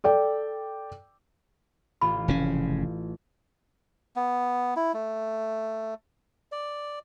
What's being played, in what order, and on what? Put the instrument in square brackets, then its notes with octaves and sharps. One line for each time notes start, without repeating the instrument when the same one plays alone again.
[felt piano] A4 D5 G5
[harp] A1 F4 [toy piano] B5
[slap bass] F1 C#3 C#4
[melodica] B3
E4
A3
D5